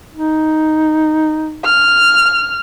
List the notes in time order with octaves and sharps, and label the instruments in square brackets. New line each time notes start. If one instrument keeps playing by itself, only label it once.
[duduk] D#4
[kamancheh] F6